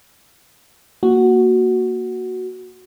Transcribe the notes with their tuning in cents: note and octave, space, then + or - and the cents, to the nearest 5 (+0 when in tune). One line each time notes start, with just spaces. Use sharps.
A#3 +0 F#4 +0